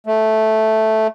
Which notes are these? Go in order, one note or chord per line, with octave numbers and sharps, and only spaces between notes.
A3